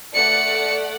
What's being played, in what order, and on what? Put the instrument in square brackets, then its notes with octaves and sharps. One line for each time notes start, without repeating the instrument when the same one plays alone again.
[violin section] A3 D5 F#5 [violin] C#7